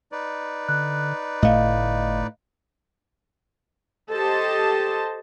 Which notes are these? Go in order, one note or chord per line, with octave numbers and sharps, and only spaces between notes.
D#4 B4 D5
D3 F#6
G1 A2 A3 D#5 F5
G4 A4 C5 D#5 A5